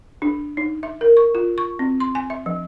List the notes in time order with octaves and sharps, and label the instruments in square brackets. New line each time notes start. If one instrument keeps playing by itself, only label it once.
[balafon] D4
D#4
E5
A#4
C#6
F4
C#6
C4
C6
G#5
E5
F3